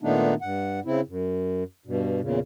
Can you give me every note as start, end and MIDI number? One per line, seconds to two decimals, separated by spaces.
0.01 0.34 46
0.01 0.34 51
0.01 0.34 57
0.01 0.34 59
0.01 0.34 62
0.01 0.34 63
0.42 0.80 43
0.42 0.80 78
0.85 1.01 49
0.85 1.01 60
0.85 1.01 64
1.07 1.64 42
1.86 2.21 43
1.86 2.21 47
2.21 2.40 40
2.21 2.40 46
2.21 2.40 49